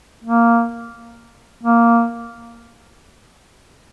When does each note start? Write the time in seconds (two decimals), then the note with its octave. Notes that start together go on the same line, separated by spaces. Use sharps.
0.24 A#3
1.63 A#3